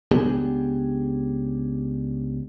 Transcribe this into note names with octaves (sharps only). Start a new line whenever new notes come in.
C#2 B3 D4 G4 G#4